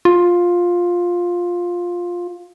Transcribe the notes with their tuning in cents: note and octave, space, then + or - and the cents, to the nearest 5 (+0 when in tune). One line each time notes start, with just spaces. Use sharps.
F4 +10